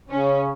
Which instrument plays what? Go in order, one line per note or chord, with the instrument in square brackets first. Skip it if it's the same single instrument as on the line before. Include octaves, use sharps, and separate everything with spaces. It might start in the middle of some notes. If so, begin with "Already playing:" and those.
[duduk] C#3 [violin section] C#4